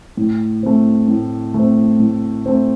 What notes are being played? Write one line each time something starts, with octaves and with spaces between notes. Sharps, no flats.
A2
A3 C4
A2
A3 C4
A2
A3 C4